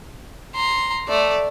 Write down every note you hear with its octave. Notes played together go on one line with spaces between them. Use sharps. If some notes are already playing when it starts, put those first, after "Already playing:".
A#5 C6
A3 D5